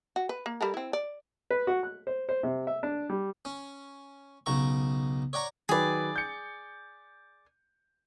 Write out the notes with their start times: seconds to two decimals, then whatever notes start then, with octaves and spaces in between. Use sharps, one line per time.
0.16 F#4
0.29 B4
0.46 A#3
0.61 G3 A4 A#4
0.74 C4 E4
0.93 D5
1.51 B4
1.67 F#4
1.83 F#6
2.07 C5
2.29 C5
2.43 C3
2.67 E5
2.83 D4
3.10 G3
3.45 C#4
4.46 B1 C#3 A#5 C#6
5.33 C#5 D5 F#5 A#5 C#6
5.69 D#3 F#3 G#4 B4 D5
6.16 G6 C#7